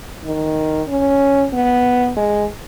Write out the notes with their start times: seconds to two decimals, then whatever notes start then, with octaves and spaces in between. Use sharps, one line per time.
0.25 D#3
0.88 C#4
1.53 B3
2.16 G#3